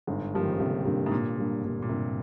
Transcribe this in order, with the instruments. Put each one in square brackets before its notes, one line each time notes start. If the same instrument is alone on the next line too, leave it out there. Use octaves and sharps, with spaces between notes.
[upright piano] G1 [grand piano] G#2
[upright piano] G2 G3 A#3 [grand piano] F3
[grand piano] D#3
C#3
[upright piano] G1 [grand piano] C3
[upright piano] G2 G3 A#3 [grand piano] C3
[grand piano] G#2
[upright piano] G1 [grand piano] A#2
[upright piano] G2 G3 A#3
[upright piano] G1 [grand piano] A#2
[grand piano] A#2
[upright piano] G2 G3 A#3 [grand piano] C3